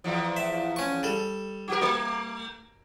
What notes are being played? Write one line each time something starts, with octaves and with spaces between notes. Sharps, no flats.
E2 F3
E5
C#4 C#6
G3 A4
F#4 G4 A#4
A3